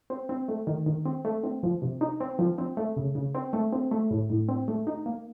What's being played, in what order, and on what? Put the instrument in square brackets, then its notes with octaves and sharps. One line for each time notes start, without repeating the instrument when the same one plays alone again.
[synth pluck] C4
C4
A3
D#3
D#3
C4
A3
C4
F3
C3
D#4
C4
F3
C4
A3
C#3
C#3
C4
A3
C4
A3
A2
A2
C4
A3
D#4
A#3